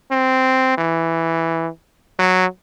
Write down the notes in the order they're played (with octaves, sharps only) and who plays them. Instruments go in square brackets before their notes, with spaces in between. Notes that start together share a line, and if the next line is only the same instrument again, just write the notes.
[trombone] C4
E3
F#3